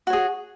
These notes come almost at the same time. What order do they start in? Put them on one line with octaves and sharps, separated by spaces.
F#4 C#5 G#4